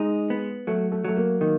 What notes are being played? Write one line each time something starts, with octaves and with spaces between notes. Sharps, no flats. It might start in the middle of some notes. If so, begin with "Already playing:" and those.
Already playing: G#3 D#4
B3
F#3 A3
A3
F#3 A3
A#3
D#3 A#3